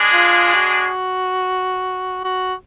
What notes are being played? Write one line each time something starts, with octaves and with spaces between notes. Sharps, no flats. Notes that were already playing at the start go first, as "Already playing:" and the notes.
Already playing: G#3 D4 G#4
F4
F#4
F#4